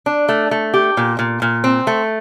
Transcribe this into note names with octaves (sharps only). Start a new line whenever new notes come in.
D4
A3
A3
G4
A#2
A#2
A#2
C4
A3